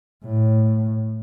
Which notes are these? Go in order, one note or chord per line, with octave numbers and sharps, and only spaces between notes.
A2